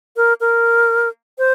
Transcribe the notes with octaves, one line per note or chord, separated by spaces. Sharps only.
A#4
A#4
C5